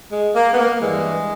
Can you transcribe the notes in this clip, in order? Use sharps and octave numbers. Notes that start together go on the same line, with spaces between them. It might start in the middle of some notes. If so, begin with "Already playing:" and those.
G#3
A#3
B3
A#3
G2 E3 G3 G#3